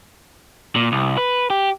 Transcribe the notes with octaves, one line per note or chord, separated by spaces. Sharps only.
A#2
C2
B4
G4